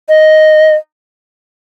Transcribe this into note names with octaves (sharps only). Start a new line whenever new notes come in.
D#5